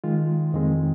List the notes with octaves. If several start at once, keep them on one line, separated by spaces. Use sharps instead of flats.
D#3 G#3 F4
F2 D#3 G#3 C4